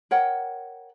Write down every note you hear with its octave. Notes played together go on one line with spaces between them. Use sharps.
A#4 C#5 F#5 G5